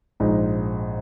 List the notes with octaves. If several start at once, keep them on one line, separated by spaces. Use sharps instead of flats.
A#1 G#2 G#3 D#4